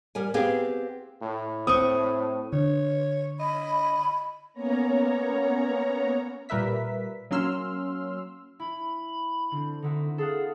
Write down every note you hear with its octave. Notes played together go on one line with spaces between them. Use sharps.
G3 A#4 G#5
B3 C4 G4 G#4 B4 F5
A2
C4 B4 C#6 D#6
D3 C#5
D#5 B5
A#3 B3 C#4 C#5 A#5
A#2 G3 A#4 B4 E5 B6
F#3 A#3 C#4 C6 E6 F6
E4 B5
D3 C4
D3 D#4 E4 F#4
G#4 A4 F5 F#5